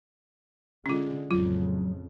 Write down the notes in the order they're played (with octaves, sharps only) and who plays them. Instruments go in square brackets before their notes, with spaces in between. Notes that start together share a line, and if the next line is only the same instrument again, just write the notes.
[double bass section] D3 G#3 [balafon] C#4 F4
[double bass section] A1 F2 C#3 [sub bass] F#3 [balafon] F4